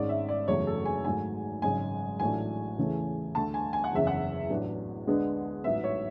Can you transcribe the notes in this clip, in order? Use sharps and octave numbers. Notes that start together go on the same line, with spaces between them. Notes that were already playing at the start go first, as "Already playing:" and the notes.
Already playing: G#1 G#2 G#3 C#4 D5
E5
D5
F#1 E2 C#3 F#3 A3 C#5
A4
G#5
G#1 G#2 F#3 A3 G#5
G#1 F#2 C#3 G#3 G#5
A1 A2 F#3 A3 D4 G#5
E2 C#3 E3 A3
D2 D3 A3 A5
G#5
G#5
F#5
F#1 E2 C#3 E5
F#5
A1 A2 F#3 B3 D4
D2 D3 G#3 B3 D4
A1 G#2 F#3 B3 E5
C#5